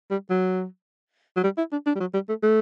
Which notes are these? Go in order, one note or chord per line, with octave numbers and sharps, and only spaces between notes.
G3
F#3
F#3
G3
E4
D4
D4
G3
F#3
G3
A3
A3